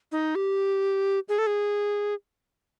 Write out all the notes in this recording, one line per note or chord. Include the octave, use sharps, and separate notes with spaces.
D#4
G4
G#4
A4
G#4